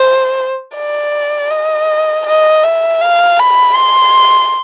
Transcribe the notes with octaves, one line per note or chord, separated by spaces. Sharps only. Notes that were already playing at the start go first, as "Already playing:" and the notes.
Already playing: C5
D5
D#5
D#5
E5
F5
B5
C6